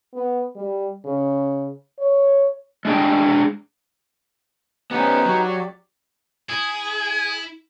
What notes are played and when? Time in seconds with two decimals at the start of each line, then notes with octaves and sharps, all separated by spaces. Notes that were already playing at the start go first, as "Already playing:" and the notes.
0.14 B3
0.56 G3
1.05 C#3
1.99 C#5
2.85 G#3 D4 G#4 G5
4.91 B3 C#4 D#4 G4 B4
5.26 F#3
5.44 G4 D5
6.49 E4 G#4